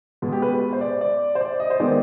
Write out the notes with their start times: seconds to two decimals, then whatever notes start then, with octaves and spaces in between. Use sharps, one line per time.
0.22 B2 G#3 B3
0.32 G4
0.42 B4
0.73 C5
0.81 D5
1.01 D5
1.35 C5
1.41 D5
1.60 D#5
1.70 C5
1.80 D#3 G#3 B3 D5